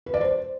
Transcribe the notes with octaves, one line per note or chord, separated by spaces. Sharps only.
B4
D5
C5